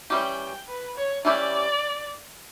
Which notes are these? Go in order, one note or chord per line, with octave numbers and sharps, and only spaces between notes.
E3 G3 C#4 G4 G5
B4
C#5
E3 G3 C#4 E4 G4 D5